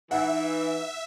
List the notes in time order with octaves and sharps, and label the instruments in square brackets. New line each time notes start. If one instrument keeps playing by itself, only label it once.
[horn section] E3 [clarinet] D#4 [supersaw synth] E5 [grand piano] F#5